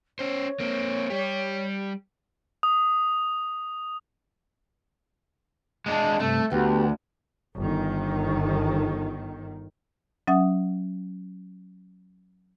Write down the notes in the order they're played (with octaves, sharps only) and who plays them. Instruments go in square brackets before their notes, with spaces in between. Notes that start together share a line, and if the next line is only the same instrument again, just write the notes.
[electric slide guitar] C#4 C5 [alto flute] C#5
[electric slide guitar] A#3 C4
G3 G4
[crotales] D#6
[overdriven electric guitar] G#3 D4
[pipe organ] G2 C3 A4 [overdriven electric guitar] A3
[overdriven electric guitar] D2 [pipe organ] B3 F#4 G4
[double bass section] G1 D#3
[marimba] F#3 C#4 E5 F#5 D#6